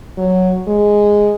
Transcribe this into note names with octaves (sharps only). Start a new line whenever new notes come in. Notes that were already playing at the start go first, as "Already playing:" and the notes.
F#3
G#3